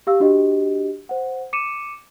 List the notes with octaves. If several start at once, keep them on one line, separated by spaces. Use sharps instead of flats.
G4 F5 E6
D4 F#4 G4 D#5
C5 F#5
D6 C#7 D#7 E7